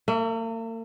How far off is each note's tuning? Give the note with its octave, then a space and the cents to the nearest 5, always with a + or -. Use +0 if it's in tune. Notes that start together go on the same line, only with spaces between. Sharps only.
A#3 -45 E5 +5